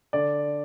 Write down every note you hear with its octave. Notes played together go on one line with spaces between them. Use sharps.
D3 D5